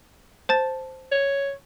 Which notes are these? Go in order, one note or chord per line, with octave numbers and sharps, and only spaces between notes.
C5 A5 A6
C#5